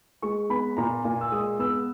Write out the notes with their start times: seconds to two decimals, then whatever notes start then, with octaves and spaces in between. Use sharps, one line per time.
0.22 G#3 C#6
0.49 B3 B5
0.77 A#2 A#5
1.04 A#2 G#5
1.21 E6
1.32 G#3 D#6
1.59 B3 E6